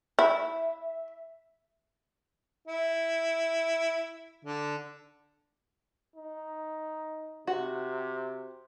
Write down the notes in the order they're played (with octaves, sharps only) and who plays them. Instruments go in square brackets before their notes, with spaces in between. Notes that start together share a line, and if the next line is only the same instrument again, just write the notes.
[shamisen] E4 [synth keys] E5
[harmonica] E4
D3
[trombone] D#4
[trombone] C3 [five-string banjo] F#4